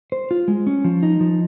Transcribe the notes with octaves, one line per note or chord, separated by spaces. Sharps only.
C5
F4
G#3
C#4
F3
D#4
F3